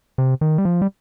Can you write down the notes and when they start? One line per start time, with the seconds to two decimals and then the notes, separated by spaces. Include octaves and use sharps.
0.18 C3
0.41 D#3
0.58 G3
0.65 F3
0.82 G3